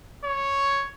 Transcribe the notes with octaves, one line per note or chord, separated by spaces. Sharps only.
C#5